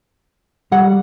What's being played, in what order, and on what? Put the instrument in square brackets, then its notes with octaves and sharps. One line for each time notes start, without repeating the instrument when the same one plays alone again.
[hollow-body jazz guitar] G3 [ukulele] F#5